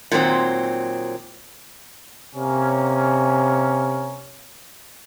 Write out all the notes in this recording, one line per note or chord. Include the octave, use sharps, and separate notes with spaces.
A#2 D#3 F#3 A3 C4
C3 A#3 C#4